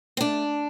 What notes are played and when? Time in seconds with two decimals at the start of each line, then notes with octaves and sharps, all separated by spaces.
0.17 C4
0.21 A3 D4